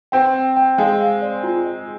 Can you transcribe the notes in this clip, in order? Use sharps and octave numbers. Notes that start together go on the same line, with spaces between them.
C4 G5
G5
G5
G#3 F5
F5
D5
F4
D#5